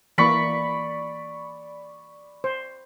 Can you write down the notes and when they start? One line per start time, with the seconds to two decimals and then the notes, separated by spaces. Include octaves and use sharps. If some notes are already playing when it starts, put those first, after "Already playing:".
0.18 E3 A#3 D5 B5 C#6
2.44 C5